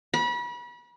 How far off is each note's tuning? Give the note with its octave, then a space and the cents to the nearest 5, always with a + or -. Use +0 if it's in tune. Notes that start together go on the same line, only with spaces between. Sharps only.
B5 -35